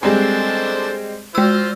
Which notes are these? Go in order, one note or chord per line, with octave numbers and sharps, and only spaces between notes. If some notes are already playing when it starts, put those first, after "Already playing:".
G3 G#3 C4 D4 A4 C5
G#3 F4 C5 E6